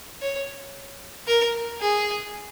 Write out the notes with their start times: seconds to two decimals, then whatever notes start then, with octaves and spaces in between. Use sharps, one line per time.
0.21 C#5
1.27 A#4
1.81 G#4